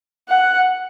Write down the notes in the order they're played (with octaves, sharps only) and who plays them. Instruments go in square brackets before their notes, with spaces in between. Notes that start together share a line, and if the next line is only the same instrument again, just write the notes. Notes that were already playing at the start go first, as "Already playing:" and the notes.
[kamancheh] F#5